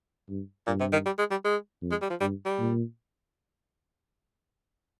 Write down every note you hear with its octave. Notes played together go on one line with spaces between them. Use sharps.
G2
G2 A#2
C3
D#3
G3
G#3
G3
G#3
F2
G#3
G3
F3
G2 G3
G3
A#2